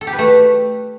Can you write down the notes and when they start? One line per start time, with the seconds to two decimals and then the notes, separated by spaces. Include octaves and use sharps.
0.01 A4
0.07 G4
0.13 B4
0.19 A3